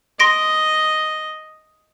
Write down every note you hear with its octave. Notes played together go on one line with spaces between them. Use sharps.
D#5 C6 A#6 D7